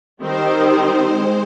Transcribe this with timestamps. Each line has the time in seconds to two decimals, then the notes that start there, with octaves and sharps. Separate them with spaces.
0.21 D#3 G3 C4 D#4 C5
1.13 G#3 C4